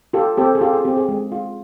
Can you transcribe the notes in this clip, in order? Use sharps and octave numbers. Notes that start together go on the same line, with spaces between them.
F4 G4 A4
C4 G4 A4
G#4
F4 G4 A4
G#4
C4 G4
G#4
G#3
F4